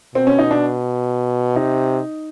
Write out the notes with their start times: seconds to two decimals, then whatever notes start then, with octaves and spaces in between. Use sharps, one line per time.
0.15 B2 C4
0.27 C#4
0.39 D#4
0.51 D4
1.56 C3 D#4